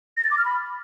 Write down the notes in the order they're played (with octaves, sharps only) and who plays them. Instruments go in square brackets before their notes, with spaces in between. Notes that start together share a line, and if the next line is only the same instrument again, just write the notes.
[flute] A#6
A6
D6
F6
B5